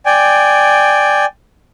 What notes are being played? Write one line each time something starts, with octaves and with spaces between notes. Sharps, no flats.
D5 G5 G#5